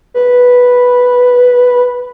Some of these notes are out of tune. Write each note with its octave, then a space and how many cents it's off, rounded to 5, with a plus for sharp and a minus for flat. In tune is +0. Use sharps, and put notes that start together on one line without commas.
B4 -5